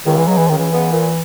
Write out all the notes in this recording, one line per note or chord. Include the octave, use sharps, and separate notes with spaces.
C#2 D#3
E3
C#3 F#3 G#3 B3
E3
C#2 D#3
E3
C#3 G#3 B3
A#2